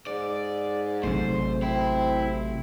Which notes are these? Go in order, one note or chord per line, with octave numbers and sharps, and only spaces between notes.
G#2 D5
A1 C3 F#3 A3 C5
C4 E4